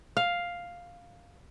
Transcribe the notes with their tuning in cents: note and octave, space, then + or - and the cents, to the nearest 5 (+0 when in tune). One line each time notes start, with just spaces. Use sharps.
F5 +5